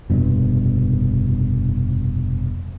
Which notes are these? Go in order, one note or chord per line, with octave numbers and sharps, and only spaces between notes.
F1 G2 B2